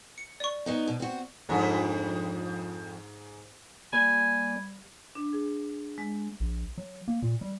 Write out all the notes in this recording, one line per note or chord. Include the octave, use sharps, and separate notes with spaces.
C#7
D5 C#6
F#3 B3 D#4
B2
C4 F#4
F2 G#2 D4
G3 A#3 D5 G#5 B5 G#6
D4
G#4
G#3
A#1
F#3
A#3
A#2
G3